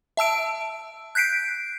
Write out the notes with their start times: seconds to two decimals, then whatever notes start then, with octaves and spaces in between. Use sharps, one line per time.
0.17 E5 A5 E6 D7
1.15 F#6 G6 B6 C7 D7